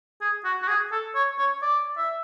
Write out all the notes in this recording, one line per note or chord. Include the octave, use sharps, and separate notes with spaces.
G#4
F#4
F#4
G#4
A4
C#5
C#5
D5
E5